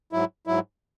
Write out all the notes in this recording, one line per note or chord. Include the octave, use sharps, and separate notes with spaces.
G#2 F#3 E4
G#2 F#3 E4